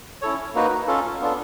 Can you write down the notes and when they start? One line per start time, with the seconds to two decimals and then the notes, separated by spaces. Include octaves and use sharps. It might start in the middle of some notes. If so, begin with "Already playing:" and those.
0.22 C#4 E4 A4 C#5
0.55 A#3 D#4 F#4 B4
0.88 C#4 F4 A4
1.21 B3 D4 F4 A4